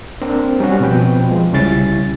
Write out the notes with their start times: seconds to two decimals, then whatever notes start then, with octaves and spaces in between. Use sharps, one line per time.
0.22 A#3 C4 D4 A#4
0.60 G3 C#4 F#4
0.80 B2 F3 C4 B4 G5
1.29 F3 G#3
1.52 C2 C#3 G3 C#4 E4 A6